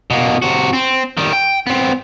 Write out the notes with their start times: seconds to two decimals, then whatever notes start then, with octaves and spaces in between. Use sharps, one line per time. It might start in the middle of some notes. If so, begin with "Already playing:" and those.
0.10 B2 A#3
0.42 C3 F#4
0.73 C4
1.17 D#3 G3
1.33 G5
1.67 B3 C4